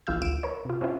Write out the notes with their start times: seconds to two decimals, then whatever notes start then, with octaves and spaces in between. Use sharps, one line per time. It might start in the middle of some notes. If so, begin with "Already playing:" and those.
0.07 A#1 E3 F4 F5 E6 G6
0.22 D2 F4 D7 E7
0.43 A#4 B4 C#5
0.65 C3 F4
0.81 C4 C#4 E4 F4